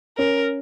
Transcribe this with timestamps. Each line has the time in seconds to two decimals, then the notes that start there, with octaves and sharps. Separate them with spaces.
0.18 C#4 A#4